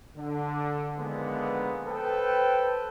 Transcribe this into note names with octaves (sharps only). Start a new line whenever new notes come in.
D3
D3 D#3 F3 G#3 A#3 B3
A4 B4 C5 G5